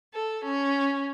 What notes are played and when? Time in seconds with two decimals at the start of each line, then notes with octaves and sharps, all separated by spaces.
0.14 A4
0.44 C#4